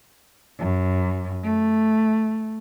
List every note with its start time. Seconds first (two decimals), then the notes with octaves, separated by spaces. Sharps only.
0.59 F#2
1.43 A3